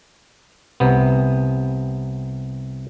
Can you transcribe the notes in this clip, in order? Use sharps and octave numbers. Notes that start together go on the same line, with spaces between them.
C2 C3 B3